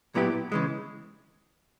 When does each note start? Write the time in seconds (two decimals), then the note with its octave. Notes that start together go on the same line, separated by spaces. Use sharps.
0.15 A#2 F#3 B3 E4 G4
0.52 C#3 E3 G#3